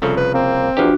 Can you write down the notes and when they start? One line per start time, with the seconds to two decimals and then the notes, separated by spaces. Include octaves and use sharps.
0.02 C2 C#3 F3 A4
0.17 B4
0.34 A#3 C4
0.77 E2 F3 D4 F#4 G4